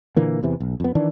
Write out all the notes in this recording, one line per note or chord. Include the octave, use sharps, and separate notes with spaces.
A#2 D3 E3 A#3
E2 C3 E3
B1
F2 B3
D#3 E3 D4